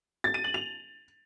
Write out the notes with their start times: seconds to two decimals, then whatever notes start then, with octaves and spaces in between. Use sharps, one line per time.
0.24 A6
0.34 D#7
0.44 F#7
0.54 F7